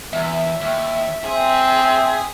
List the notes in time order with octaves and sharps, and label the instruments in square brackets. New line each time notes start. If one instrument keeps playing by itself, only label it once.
[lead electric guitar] E2 [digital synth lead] E5
[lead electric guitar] D#2
[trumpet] C4 [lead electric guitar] G#4